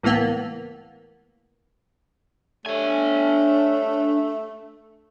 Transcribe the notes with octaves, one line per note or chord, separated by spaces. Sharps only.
C#2 A2 E3 A#3 B3
G2 A3 D4 C#5 G#5